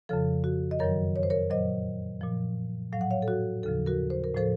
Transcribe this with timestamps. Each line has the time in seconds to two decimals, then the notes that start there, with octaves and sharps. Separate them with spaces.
0.09 F2 C#3 F3 A4
0.44 F#4
0.71 D#5
0.79 F#2 D#3 F#3 A#4 C#5
1.16 C#5
1.23 C5
1.30 A#4 C#5
1.50 A#2 F#3 C5 D#5
2.21 A#2 F3
2.93 A2 F#3 F5
3.01 F#5
3.11 C#5 F5
3.22 A4
3.28 F#4
3.63 D#2 C#3 F3 A4
3.86 F#4 A#4
4.10 C5
4.24 A#4
4.34 A2 F3 A4 C5